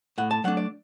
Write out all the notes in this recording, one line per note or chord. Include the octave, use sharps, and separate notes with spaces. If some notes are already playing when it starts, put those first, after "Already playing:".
A2 F#5
A5
F#3 A3 D4 F#5
D5